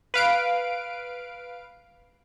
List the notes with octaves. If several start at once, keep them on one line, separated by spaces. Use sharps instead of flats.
B4 F5 D7